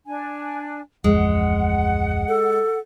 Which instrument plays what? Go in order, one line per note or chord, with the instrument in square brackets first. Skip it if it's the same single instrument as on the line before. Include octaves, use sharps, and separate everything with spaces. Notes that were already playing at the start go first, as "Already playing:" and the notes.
[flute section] D4 G#5
[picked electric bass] D1 A1 F2 [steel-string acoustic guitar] G#3 [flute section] F#5
[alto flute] A4